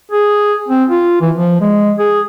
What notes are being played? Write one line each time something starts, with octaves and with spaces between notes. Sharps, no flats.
G#4
C4
F4
E3
F3
G#3
G#4